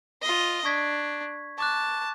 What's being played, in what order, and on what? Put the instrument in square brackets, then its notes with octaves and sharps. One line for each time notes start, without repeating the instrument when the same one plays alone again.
[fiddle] F4 D#5
[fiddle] D4 [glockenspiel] C#6 G#6 B6
[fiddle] A5 [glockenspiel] C#6 D6 F#6